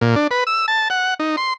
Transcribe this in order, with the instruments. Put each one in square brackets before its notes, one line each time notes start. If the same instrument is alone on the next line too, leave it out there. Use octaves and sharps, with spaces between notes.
[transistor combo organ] A#2
D4
B4
E6
A5
F#5
D#4
C6